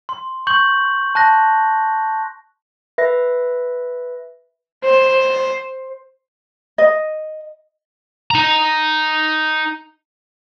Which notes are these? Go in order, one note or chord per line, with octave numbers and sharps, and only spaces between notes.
C6
C#6 G6 F#7
A5 F#6 A#6
B4 E5 A#6
C5
D#5
D#4 A#5